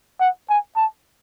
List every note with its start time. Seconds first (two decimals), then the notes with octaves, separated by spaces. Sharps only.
0.20 F#5
0.50 G#5
0.77 A5